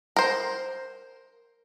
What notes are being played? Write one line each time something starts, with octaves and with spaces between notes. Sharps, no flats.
A#4 C5